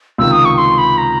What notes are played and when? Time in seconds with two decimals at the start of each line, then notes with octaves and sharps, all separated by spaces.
0.18 C#2 C3 D#3 E6
0.32 D#6
0.45 C#6
0.58 C6
0.78 B5
0.98 A#5